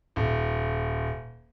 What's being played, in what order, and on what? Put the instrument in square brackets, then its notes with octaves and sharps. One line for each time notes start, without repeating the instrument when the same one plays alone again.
[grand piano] D#1